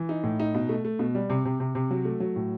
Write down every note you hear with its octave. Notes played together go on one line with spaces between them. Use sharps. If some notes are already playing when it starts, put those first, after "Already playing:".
Already playing: E3
D#4
A2
D#4
B2
A3
A3
B2
G3
C3
C3
C3
C3
F#3
A3
F#3
A2